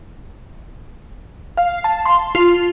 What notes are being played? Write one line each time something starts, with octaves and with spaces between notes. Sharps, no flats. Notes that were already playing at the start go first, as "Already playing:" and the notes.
F5
A5
C6
F4